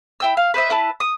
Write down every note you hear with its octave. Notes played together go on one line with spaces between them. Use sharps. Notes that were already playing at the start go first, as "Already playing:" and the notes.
E4 G5 E6
F5
B4 C5 D#5 E5
E4 B4 A5
D#6